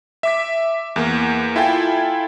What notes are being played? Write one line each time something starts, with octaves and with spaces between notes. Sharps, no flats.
E5 D6 B6
E2 A#3
E4 F4 A4 G5 G#5